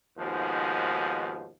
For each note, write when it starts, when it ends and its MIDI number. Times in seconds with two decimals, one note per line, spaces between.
0.18 1.51 39
0.18 1.51 44
0.18 1.51 47
0.18 1.51 53